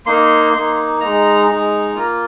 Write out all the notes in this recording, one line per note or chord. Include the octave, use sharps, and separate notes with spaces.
A#3 D#4 C6
A#3 D#4
G#3 D#4 A#5
G#3 D#4
A#3 F4